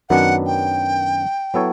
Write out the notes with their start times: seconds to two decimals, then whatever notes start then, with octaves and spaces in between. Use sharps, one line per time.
0.10 F#2 D#3 F#3 B3 D4 F#5
0.46 G5
1.54 F#3 B3 E4 A4 C#5